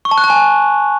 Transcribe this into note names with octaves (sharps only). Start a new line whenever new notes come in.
C#6
A5
F#6
A5
G#5